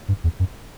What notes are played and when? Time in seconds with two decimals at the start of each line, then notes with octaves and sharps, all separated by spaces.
0.08 G2
0.24 E2
0.40 F#2